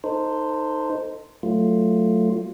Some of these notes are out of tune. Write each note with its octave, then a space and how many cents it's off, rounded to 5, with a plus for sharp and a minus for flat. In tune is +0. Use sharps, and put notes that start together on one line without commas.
D#4 +0 A4 +25 C5 -5
F#3 +0 A3 +10 F4 +0